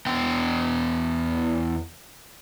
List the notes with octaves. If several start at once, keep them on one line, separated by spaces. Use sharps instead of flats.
E2 B3 G5